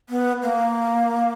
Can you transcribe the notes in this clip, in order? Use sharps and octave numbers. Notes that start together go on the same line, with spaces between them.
B3
A#3